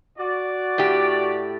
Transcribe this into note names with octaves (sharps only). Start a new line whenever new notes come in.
F#4 D5
A2 G4